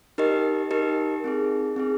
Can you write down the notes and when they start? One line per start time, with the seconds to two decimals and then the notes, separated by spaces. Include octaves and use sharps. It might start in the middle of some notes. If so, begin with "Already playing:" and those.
0.18 D#4 G4 A#4 D#5
0.71 D#4 G4 A#4 D#5
1.24 C4 D#4 G#4
1.76 C4 D#4 G#4